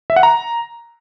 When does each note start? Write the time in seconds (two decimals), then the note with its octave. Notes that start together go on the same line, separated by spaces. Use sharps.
0.10 E5
0.16 F#5
0.23 A#5